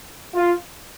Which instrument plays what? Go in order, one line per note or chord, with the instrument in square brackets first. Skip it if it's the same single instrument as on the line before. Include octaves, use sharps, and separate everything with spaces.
[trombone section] F4